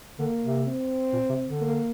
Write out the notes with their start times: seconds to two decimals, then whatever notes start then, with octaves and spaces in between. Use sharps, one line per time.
0.19 D3 A#3
0.43 C3
0.67 C4
1.13 A#2
1.29 C3
1.46 D3
1.61 A#3